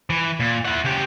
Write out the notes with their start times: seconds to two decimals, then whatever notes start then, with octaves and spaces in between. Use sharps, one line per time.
0.10 E3
0.40 A#2
0.65 E4 F#5
0.85 C#3 G4